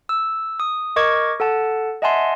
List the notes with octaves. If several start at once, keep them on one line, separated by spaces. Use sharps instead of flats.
E6
D#6
A#4 D#5 C#6 D6 G#6
A4 F#5 A5
D#5 E5 F#5 G#5 A5 C6